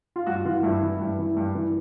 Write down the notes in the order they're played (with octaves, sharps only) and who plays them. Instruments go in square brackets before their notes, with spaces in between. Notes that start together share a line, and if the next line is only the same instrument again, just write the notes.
[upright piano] F4
G2 F#4
E3 F4
G2 E4
E3
G2
E3
G2
E3